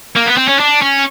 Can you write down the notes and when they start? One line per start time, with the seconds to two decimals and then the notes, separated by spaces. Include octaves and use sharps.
0.17 A#3
0.27 B3
0.38 C4
0.49 C#4
0.60 D4
0.82 C#4